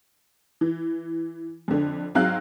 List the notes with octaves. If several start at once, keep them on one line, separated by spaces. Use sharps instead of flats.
E3
F2 D3
G#2 F#3 C4 F5 E6 F#6